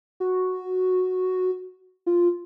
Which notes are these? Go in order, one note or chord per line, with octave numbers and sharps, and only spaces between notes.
F#4
F4